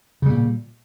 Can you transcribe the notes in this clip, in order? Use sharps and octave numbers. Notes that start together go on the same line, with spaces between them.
A#2 C#3 G3